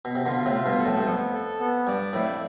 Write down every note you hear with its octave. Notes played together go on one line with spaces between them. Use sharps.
B2
C3
B2 D3 F4
A2 C3
F4
G2 B2
A4
F2 A2
G2
F2 B3
A4
B3
G2 D5
F2 A2 E4